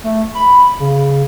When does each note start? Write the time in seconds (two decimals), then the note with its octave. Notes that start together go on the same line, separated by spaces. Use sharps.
0.04 A3
0.35 B5
0.80 C#3